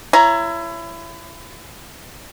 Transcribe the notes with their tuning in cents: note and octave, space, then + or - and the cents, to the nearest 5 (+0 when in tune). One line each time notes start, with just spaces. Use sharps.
E4 +25 C#5 +0 A#5 +0